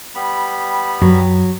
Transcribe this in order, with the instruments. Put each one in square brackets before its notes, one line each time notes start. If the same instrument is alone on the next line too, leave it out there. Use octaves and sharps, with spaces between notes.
[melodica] G3 B3 B5
[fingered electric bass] F#2 [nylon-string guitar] F#3